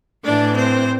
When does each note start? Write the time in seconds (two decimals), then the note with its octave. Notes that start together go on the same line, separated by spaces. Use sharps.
0.24 A2 E3 D4 D5
0.55 C4 C5